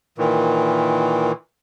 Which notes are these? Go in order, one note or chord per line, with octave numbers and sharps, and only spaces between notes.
A#2 D#3 E3